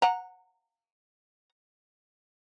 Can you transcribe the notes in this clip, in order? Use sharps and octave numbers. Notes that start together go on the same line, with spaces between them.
F#5 A#5